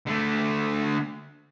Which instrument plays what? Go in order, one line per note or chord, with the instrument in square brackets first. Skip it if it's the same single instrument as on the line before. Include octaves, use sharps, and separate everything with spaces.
[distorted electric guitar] D3 A3